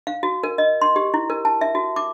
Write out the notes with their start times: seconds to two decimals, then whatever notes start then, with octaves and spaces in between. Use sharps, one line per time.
0.07 F5
0.23 F#4
0.43 A#4
0.58 D#5
0.82 C6
0.96 G4
1.14 E4
1.30 A#4
1.45 A5
1.61 E5
1.75 F#4
1.96 D6